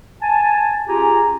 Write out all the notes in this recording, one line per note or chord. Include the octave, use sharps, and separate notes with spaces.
G#5 A5
C#4 F4 G4 G#4 G#5 A#5